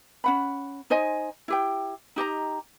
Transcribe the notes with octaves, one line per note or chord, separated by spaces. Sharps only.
C#4 F#5 B5
D#4 C5 D#5 G#5
E4 G4 G5
D#4 G4 D#5 A#5